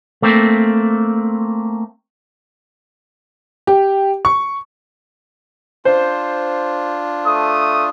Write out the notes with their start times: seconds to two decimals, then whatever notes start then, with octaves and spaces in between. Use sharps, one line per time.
0.22 A3 A#3 C4
3.67 G4
4.25 C#6
5.85 D4 F4 C5
7.27 A3 D#6